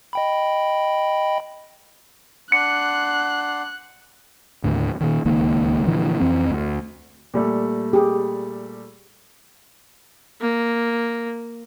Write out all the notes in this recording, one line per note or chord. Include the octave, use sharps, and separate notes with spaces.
D#5 G5 B5
D4 F#5 C6 F#6 C#7
D#2 A2 D3
A#2 D#3
D1 C#2 D#3 A#3
A#2 D3 E3 F3
F2 E3 C4
D2
A#2 G3 A3
G4 G#4
A#3